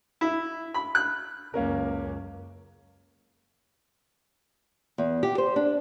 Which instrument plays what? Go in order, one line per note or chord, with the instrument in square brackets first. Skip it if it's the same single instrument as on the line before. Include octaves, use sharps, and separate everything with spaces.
[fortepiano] E4
B5
F#6
[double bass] C#2 F#2 [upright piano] A#3 C#4 A#4
[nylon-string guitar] E2
G4
C5
D4